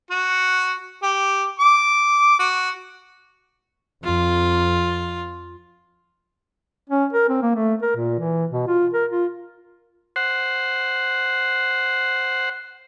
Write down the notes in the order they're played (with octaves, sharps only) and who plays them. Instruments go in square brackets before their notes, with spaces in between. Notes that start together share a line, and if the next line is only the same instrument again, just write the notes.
[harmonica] F#4
G4
D6
F#4
[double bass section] F2 [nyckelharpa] F4
[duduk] C#4
A#4
C4
A#3
A3
A#4
A#2
E3
B2
F4
A#4
F4
[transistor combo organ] C5 F#5